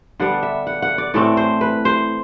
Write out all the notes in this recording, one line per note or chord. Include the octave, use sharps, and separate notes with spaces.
D3 G3 B3 D4 F#5
E5
F#5
F#5
D5
A2 E3 A3 C4 D5
C5
B4
C5